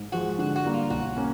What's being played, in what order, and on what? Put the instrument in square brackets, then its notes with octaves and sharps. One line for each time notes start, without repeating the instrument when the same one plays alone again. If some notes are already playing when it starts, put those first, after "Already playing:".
Already playing: [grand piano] G#2
[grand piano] F3 G#3 [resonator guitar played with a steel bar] F#4
[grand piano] D3 [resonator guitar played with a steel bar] F#4
[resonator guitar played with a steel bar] F#4
[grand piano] G3 A#3
[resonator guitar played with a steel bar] F4
[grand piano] B1 [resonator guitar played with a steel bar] F#4
[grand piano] A#3 C#4